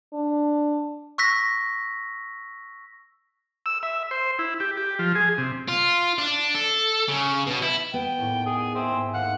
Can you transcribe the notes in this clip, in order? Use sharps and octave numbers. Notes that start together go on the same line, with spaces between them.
D4
C#6 E6 F#6 A#6 B6
E6
E5
C5
E4
G4
G4
F3
G#4
C3
F4
D4
A4
C#3
B2
E4
B3 G5
D#2 A2
G#4
C4 E5 G#5
G#2 E6
D#2 F5 F#5 F6